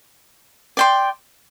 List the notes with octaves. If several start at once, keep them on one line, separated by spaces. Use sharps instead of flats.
D5 G5 C6